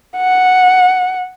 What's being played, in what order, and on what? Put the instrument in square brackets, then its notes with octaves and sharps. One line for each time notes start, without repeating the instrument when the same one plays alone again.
[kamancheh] F#5